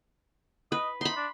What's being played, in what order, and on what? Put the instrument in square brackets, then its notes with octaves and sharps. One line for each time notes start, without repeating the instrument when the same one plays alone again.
[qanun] B4 [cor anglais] D#5
[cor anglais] D#4 [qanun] B5 C6
[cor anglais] D4